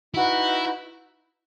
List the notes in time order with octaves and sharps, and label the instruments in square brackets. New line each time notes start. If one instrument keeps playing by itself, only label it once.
[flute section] D#4 F#4 B4 [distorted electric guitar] E4